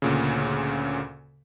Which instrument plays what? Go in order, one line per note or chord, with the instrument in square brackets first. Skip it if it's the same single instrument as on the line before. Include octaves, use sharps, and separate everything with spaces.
[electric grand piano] D2 A#2 C#3